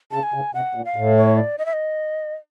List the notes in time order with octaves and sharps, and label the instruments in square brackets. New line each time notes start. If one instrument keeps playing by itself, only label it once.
[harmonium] C#3 [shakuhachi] A5
[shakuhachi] G#5
[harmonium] C#3
[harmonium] C3 [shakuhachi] F#5
[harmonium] A#2
[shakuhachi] F5
[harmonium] A2
[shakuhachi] C#5
D5
D#5
E5
D#5